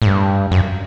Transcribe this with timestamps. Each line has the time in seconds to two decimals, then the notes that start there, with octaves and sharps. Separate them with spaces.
0.02 A2
0.06 G2
0.51 F#2